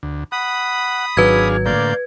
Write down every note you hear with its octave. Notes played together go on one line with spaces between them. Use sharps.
D2
F#5 B5 D#6
G#1 F#3 D4 G#4 B4 F5 G#6
A2 D3 A#3 D5 F5 G6